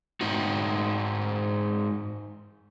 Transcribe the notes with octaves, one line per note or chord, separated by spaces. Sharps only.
G#2 D#4 F#4